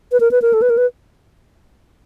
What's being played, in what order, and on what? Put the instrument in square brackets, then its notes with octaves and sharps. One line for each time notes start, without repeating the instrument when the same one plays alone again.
[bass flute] B4
A#4
B4
A#4
A4
B4
A#4
B4